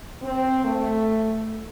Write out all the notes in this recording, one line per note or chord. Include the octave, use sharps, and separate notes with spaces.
C4
A3